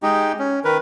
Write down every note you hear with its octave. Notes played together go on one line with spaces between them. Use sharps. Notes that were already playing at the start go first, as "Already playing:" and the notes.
G#3 D#4 G4
C#4
D#3 A#4 B4